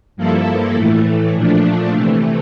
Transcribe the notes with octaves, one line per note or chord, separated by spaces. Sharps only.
G2 F3 A#3 E4 A4
A2 E3 A3
A#2 F3 A3 D4
C3 E3 A3